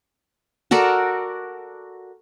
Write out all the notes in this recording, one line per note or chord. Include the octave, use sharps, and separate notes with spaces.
F#4 A4 A#4 D5